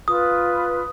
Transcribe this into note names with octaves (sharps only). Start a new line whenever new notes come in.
F4 B4 D#6